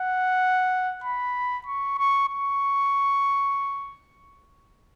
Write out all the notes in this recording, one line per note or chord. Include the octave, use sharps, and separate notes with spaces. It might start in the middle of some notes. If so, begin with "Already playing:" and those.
Already playing: F#5
B5
C#6
C#6
C#6